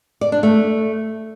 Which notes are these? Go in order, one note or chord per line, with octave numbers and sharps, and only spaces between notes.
D5
D4
A3